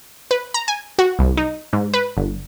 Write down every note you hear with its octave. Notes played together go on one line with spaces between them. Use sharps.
B4
A#5
G#5
F#4
C2
D#4
G#2
B4
G1